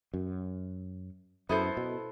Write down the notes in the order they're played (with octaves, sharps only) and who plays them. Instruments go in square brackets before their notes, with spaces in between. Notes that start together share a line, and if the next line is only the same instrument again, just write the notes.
[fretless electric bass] F#2
[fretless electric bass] F#2 [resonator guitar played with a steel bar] B3 E4 A4 C5
[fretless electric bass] B2